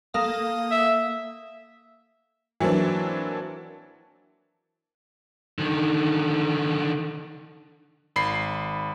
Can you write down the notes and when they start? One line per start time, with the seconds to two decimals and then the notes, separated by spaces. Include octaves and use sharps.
0.14 A#3 A4 F5 D#6
0.71 E5
2.60 E3 F#3 A#3 C4 D4
5.59 D3 D#3
8.16 G#1 B5 C7